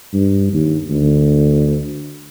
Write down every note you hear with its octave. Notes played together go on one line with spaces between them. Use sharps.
G2
D#2
D2